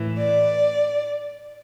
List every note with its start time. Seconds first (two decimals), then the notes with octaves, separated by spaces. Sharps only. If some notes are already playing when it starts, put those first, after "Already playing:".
Already playing: A2 E3
0.17 D5